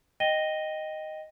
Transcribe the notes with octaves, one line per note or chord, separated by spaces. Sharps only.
D#5 G5 A#6 D#7 G7